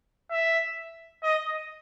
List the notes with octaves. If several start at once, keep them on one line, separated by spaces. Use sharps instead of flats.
E5
D#5